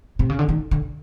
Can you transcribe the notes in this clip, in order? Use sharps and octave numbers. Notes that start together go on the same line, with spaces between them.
C3
C#3
D3
D#3
D3